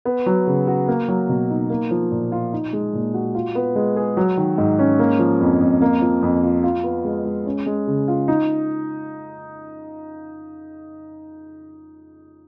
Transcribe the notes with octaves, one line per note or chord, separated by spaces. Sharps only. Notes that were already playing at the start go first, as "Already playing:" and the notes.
B3
F#3
C#3
F#4
A#3
F#3
B2
D#4
A#3
F3
A#2
F4
D#4
G#3
A#2
F#4
F4
B3
G#3
G#4
F#3
D#3
G#2
C#4
A#3
F3
F2
F2
A#3
F3
F2
F4
F4
B3
G#3
G#3
C#4
G#3
C#3
F4
D#4